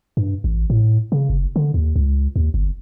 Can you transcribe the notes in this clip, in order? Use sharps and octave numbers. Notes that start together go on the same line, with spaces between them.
G2
A1
A2
C#3
F#1
D3
D#2
C#2
D#2
G1